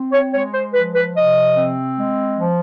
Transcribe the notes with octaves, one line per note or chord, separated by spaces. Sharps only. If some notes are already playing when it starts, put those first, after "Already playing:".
Already playing: C4
C#5
G#3 C#5
C5
F3 B4
B4
C3 D#5
C4
G#3
F3